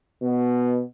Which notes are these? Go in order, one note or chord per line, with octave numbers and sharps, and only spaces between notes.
B2